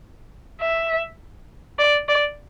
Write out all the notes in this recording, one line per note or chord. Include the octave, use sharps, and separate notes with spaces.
E5
D5
D5